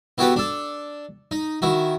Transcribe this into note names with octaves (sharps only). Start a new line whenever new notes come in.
B3 E4 F#4 G4 A4 B4
D4 A4
D#4
D#3 E4 F#4